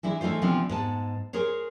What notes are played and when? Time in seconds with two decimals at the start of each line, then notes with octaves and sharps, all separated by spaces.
0.03 E3 G#3 D4 E4
0.21 E3 A3 D#4 F4 C5
0.42 C3 E3 F3 B3 C4 D4
0.69 G#2 B3 A5
1.33 G#4 A#4 C5 C#5